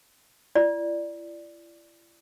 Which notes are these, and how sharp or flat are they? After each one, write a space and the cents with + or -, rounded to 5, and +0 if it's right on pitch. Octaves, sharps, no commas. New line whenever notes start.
E4 +45 D5 +0